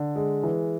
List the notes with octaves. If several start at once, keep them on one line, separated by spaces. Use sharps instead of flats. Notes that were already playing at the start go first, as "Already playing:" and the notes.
Already playing: D3
G#3
E3